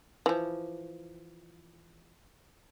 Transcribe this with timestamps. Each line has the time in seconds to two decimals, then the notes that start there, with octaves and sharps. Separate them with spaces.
0.26 E3 F3